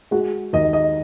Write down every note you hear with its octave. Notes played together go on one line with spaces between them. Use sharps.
G#3 F#4
D#2 D#5
D#5